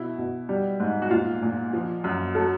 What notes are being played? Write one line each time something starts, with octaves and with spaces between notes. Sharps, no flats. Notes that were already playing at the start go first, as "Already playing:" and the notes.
Already playing: B2 E4
B2
G3
G#2
F#4
A#2 F4
A#2
F3
F#2
F#3 A4